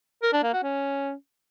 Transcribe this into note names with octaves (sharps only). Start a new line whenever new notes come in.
A#4
D4
A#3
F#4
C#4